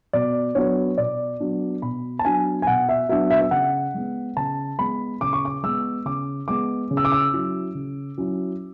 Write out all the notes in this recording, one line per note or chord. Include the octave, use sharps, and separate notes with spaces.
B2 D5
F#3 B3 D4 C#5
B2 D5
F#3 B3 D4
B2 B5
A5
F#3 B3 D4 G#5
G#5
B2 F#5
E5
F#3 B3 D4 E5
E5
E5
C#3 F#5
G#3 B3
C#3 A5
G#3 B3 B5
C#3 D6
C#6
D6
G#3 B3 E6
C#3 D6
G#3 B3 D6
C#3
E6
D6
E6
F#3 C#4 E4
C#3
F#3 C#4 E4